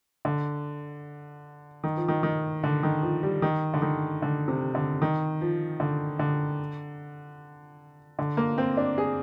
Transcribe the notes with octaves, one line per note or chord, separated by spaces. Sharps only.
D3
D#3
F3
D#3
D#3
D3
D#3
F3
G3
D#3
D3
D#3
D3
C3
D3
D#3
F3
D3
D3
D3
A#3
C4
D4
G#4